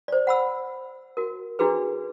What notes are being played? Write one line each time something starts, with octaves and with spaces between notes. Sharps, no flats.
C5 D5
F#5 B5 E6
F#4 A#4
D4 E4 F#4 G#4 B4